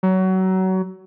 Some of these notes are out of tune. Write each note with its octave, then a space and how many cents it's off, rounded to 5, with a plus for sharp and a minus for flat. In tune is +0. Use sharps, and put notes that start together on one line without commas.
F#3 +25